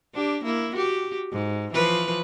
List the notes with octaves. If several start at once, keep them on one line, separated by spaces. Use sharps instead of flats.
D4 G4
A#3 E4
F#4 G4
G#2
E3 F3 B4